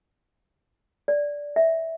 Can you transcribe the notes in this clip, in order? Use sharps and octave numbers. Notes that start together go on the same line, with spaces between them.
D5
E5